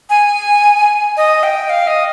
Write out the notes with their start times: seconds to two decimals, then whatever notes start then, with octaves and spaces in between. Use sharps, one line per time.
0.10 G#5
1.17 D#5
1.43 G5
1.70 F5
1.87 D#5